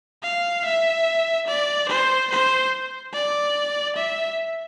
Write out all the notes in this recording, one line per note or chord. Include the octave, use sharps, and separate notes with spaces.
F5
E5
D5
C5
C5
D5
E5